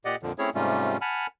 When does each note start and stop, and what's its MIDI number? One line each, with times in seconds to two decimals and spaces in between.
0.05 0.16 46
0.05 0.16 67
0.05 0.16 74
0.05 0.16 75
0.05 0.16 78
0.23 0.32 41
0.23 0.32 46
0.23 0.32 50
0.23 0.32 53
0.38 0.50 57
0.38 0.50 60
0.38 0.50 61
0.38 0.50 64
0.38 0.50 68
0.38 0.50 73
0.55 0.97 44
0.55 0.97 48
0.55 0.97 55
0.55 0.97 57
0.55 0.97 61
0.55 0.97 65
1.01 1.27 78
1.01 1.27 80
1.01 1.27 81
1.01 1.27 83
1.01 1.27 89